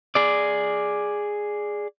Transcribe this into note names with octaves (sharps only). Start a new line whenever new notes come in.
G#4 D5